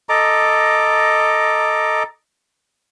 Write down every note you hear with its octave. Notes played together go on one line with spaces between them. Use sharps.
A4 D#5 A#5 D6